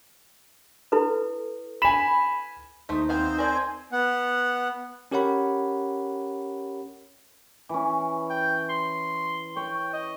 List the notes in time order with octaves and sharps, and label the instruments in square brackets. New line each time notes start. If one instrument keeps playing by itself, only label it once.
[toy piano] E4 A4 B4
[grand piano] G#5 E7 [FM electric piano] B5
[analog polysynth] D#2 [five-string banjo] A3 C5 [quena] D#4
[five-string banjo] B3 F5 G#5 [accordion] C4 C5
[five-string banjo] A#4 D5 A5 [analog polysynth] G#5 C6
[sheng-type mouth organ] B3 F#5
[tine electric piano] C#4 G4 A#4 C#5 F#5 B5
[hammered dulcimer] E3 C#4
[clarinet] G5
C6
[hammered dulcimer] C#5 [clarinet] G5
[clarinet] D#5